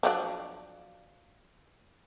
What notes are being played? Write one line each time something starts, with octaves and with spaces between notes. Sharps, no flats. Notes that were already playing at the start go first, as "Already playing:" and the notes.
F3 F#3 D4